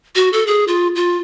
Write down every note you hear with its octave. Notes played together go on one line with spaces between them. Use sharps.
F#4
A4
G#4
F4
F4